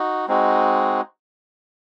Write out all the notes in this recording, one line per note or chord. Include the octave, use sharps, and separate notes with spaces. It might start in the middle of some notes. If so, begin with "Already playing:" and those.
Already playing: D#4 F#4
G#3 C4 D#4 F#4